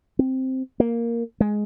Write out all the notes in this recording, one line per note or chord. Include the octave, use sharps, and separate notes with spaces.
C4
A#3
G#3